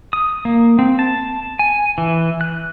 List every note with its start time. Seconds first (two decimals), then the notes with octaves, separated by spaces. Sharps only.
0.13 D#6
0.45 A#3
0.79 C4
0.99 A5
1.59 G#5
1.98 E3
2.41 F#6